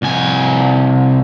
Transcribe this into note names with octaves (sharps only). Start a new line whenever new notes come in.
C2 G#5